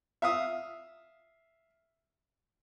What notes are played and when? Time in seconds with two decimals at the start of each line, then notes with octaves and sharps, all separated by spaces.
0.22 E5 F5 D#6